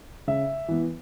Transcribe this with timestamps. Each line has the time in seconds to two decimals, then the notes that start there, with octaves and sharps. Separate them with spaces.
0.27 C#3 E5
0.68 E3 B3